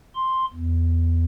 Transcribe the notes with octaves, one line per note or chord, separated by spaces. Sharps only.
C6
E2